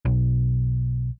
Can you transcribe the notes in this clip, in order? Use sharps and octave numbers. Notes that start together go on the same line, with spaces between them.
B1